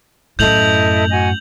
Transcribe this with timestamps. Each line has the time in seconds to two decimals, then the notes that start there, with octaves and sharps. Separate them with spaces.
0.39 F#2 A2 E4 A4 D#5 G6 F7 F#7
1.11 F#4 D#5 G#5